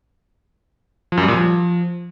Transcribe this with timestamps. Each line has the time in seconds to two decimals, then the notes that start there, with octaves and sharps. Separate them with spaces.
1.12 F3
1.17 F#2
1.23 G3
1.28 A#2
1.34 F3